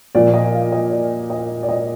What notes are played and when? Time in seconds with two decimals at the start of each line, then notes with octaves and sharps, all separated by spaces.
0.15 A#2 F3 D5
0.34 D#5
0.53 F5
0.72 D#5
0.91 D5
1.30 D#5
1.63 D5
1.69 D#5